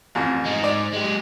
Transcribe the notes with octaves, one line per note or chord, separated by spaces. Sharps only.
A1 F2
G#3 D#4
D5
G#3 G4